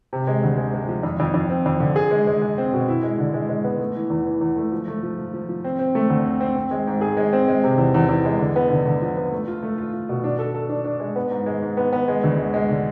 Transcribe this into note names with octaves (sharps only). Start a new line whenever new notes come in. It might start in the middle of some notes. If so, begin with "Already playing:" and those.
C3
G#3
D2
G#3
G#3
F3
F2
F2
F2
C4
F2
D3
G#4
G#3
G#3
G#3
C4
B2
E4
G#3
D3
G#3
G#3
B3
A3
E3
E2
E3
E2
A3
F3
A3
F3
F3
F3
F3
C4
C4
A3
D2
C4
C4
C4
G#3
G#2
G#4
G#3
C4
G#3
C3
E2
E2
E2
G#3
D3
B3
D3
D3
F3
B3
A3
F4
A3
F4
F4
B2
D4
A4
A4
D4
D4
G#3
B3
G#2
G#3
G#2
B3
B3
G#3
D2
G#3
G#3
D3